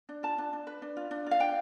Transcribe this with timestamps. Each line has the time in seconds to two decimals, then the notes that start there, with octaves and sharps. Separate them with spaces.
0.09 D4
0.23 F4 A5
0.38 D4
0.53 D4
0.67 B4
0.82 D4
0.97 F4
1.11 D4
1.26 F4 F5
1.40 D4 G5